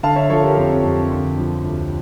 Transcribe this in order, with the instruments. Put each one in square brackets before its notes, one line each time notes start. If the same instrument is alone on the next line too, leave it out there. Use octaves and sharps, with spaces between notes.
[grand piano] D3 F5 A5
C#5 E5
F3 A4 C#5
G4 A#4
F2 G4
F2
D3
F3
D2